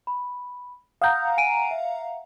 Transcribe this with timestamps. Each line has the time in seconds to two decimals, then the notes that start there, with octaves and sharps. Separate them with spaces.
0.07 B5
1.02 F5 F#5 A#5 D#6 G6
1.37 G#5 D7 D#7
1.71 E5